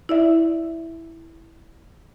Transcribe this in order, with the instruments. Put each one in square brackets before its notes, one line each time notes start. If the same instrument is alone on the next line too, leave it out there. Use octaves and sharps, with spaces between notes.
[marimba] E4 D5 E5